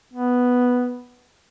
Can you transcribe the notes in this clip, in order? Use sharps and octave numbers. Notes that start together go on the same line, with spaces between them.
B3